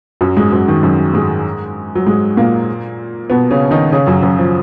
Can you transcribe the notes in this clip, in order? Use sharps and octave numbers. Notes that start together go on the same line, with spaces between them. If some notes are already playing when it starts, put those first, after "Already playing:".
F#2 F#3
G#2 G#3
F#2 F#3
D#3
F#2 F#3
G#2 G#3
F#3
G#2 G#3
A#2 A#3
B2 B3
C#3 C#4
D#3 D#4
C#3 C#4
F#2 F#3
F#2 F#3
F3